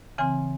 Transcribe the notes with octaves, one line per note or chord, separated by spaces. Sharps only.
C#3 E3 C4 G#5